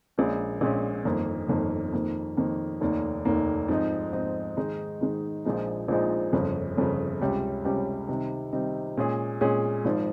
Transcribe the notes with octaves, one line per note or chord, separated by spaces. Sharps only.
A#1 A#2 G#3 C#4
A#1 A#2 G#3 C#4
G1 F2 D#3 A#3
G1 F2 D#3 A#3
F2 D#3 A#3
F2 D#3 A#3
F1 D#2 D#3 A#3
F1 D#2 D#3 A#3
G#2 F3 C4 D#4
G#2 F3 C4 D#4
G#2 D#3 G#3 D#4
G#2 D#3 G#3 D#4
A#1 A#2 F3 G#3 D#4
A#1 A#2 F3 G#3 D#4
G1 F2 C#3
G1 F2 C#3
C#2 C3 G3 C#4 G4
C#2 C3 G3 C#4 G4
C3 D#3 G3 C4 D#4
C3 D#3 G3 C4 D#4
A#2 G#3 C#4 G#4
A#2 G#3 C#4 G#4
G#1 G#2 F3